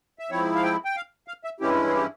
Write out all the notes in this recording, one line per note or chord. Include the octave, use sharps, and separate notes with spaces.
E5
G#2 F3 C4 E4 C#5
F5
G5
G5
F5
F5
E5
G2 E3 G#3 C#4 E4 G4
G#4
G4